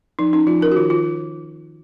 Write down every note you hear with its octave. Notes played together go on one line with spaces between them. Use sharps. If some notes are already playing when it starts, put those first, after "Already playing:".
F3 D#4
C#4 D#4
F3 F4
C#4 A#4
F#4
D#3 F4
D#3 F4